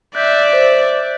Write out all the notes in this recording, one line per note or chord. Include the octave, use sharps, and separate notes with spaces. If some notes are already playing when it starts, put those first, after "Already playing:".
D5 E5 F#6 G6 B6
C5